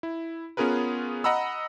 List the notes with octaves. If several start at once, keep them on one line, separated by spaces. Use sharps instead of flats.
E4
B3 C#4 F4 G#4 A#4 B4
D#5 F#5 A#5 B5 E6